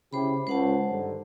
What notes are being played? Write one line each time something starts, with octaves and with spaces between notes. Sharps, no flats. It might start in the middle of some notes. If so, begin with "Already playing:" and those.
C#3 E4 G4 C5 B5
C#2 C5 F#5 A5
G2 D3 D#3